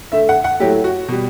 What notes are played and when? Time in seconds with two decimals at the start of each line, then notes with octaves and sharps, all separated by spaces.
0.12 D3 A3 E5
0.29 F#5
0.44 F#5
0.60 A2 F#3 A3 G4
0.84 F#4
1.08 B2 G3